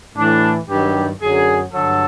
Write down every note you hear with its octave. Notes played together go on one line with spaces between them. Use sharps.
A2 E3 D4
G2 D#3 F#3 G4
F#2 D3 F#3 G#4
G2 D3 F#3 A4